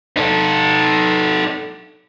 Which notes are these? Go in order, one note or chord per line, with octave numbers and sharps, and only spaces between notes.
D#4 A4